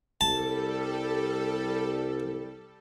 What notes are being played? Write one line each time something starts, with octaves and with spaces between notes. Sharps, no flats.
C2 G3 A4 A5